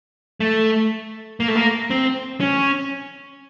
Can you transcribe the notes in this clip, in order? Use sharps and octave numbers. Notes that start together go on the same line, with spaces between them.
A3
A#3
A3
A#3
C4
C#4